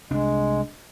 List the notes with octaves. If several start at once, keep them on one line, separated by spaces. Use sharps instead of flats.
C2 G#3 D4